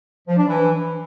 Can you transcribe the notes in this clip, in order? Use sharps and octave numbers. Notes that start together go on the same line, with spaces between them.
F3
D4
E3